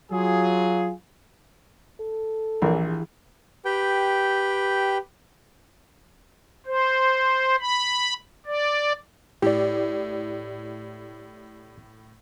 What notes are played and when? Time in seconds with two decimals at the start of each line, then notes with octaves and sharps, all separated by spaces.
0.12 F#3 F4 G#4
2.00 A4
2.62 A#1 E3 G4 G#4
3.65 G4 B4 G5
6.66 C5
7.61 B5
8.46 D5
9.42 A2 G4 D5